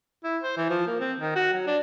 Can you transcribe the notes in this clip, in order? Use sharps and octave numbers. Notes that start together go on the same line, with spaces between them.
E4
C5
E3
F3
A#3
C4
D#3
F#4
F#3
D4